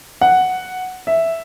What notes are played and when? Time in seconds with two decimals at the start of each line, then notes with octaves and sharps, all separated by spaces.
0.21 F#5
1.07 E5